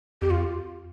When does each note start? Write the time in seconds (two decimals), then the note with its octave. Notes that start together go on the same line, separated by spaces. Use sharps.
0.22 F2 G4
0.30 F4